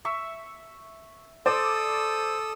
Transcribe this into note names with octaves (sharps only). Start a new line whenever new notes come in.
E5 C#6 E6
A4 C5 D5 D#6 E6